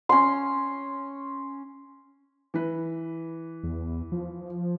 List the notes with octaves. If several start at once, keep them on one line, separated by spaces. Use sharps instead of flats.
C#4 C6
E3 B4
E2
F3